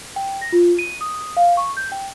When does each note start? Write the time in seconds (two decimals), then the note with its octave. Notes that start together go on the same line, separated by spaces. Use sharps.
0.16 G5
0.41 A#6
0.52 F4
0.79 D#7
1.01 D#6
1.37 F5
1.57 C#6
1.77 G6
1.92 G5